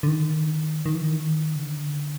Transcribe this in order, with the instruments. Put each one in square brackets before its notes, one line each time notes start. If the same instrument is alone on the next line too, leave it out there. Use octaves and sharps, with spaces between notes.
[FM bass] D3
D#3
D#3
E3
D#3
C#3
D3